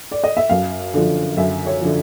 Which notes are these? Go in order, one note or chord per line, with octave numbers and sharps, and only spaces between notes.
D5
D#5
E5
F#2 F5
D3 F3
F#2 E5
C#5
D3 F3